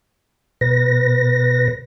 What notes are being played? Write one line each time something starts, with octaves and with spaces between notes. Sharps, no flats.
B2 B4 A#6